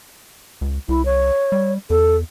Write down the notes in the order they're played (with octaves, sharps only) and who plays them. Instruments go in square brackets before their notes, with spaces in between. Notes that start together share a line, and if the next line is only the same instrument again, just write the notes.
[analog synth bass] C#2
[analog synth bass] C2 [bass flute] E4
[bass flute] C#5
[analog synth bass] G3
[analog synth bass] E2 [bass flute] A4